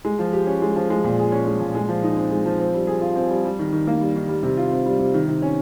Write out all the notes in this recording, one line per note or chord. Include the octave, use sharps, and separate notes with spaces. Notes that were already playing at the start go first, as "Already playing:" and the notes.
G#3
F3
G4
C#4
G#3
F3
G#3
A#2
G#4
C#4
G#3
A#2
G#3
F3
D#4
C4
G#3
F3
C4
G3
G#4
F4
C4
G3
G3
D#3
D#3
A#3
G3
D#3
G3
C3
F4
C4
G3
C3
D#3
C3
C#4